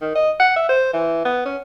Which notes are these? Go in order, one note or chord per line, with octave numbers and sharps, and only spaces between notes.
D#3
D#5
F#5
E5
C5
E3
B3
C#4